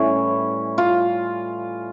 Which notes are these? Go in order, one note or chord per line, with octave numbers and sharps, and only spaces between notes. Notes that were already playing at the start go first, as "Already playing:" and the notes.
Already playing: A2 E3 G3 C#4 E4
F4